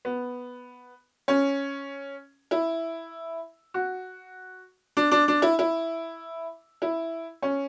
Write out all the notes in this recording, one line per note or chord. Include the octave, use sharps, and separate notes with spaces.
B3
C#4
E4
F#4
D4
D4
D4
E4
E4
E4
C#4